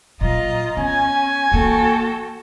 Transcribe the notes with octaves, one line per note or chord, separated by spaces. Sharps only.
A#2 F#3 F4 D#5 A#5
B3 C#4 G#5
E3 A#3 F#4 A4 G5